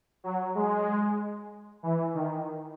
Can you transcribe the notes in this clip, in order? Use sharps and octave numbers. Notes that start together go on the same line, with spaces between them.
F#3
G#3
E3
D#3